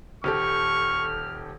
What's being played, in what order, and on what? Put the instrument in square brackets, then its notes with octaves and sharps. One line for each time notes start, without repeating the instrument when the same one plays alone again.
[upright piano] D#1 G4 A4 [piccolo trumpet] C#6 [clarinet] F6